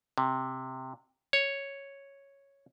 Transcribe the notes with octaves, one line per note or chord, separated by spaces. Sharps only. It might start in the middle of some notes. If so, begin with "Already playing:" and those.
C3
C#5